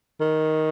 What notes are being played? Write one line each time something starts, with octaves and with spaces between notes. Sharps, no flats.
D#3